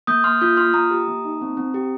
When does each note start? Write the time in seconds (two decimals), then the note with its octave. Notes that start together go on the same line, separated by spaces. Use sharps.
0.07 A#3 D#6 G6
0.24 A#3 C6 F6
0.41 F4 D#6 G6
0.57 F4 C6 F6
0.74 A#3 A#5 D#6
0.91 G4
1.08 A#3
1.25 D#4
1.41 C4
1.57 C4
1.74 G4